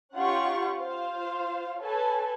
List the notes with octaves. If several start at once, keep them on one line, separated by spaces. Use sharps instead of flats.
C#4 D#4 F4 G4 F#5 C#6
F4 C5 F5
A4 B4 C#5 G#5 A5